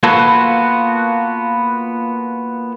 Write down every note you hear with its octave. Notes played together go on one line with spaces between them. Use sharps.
A#3 B3 F4 F#4 A4 B4